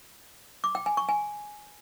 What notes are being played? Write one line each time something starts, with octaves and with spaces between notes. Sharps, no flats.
D6
G5
G#5
C#6
G#5